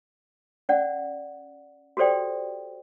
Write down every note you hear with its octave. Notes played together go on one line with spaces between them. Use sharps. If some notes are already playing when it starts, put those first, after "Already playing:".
C#4 D5 F#5
F#4 G4 A4 C5 D5 G5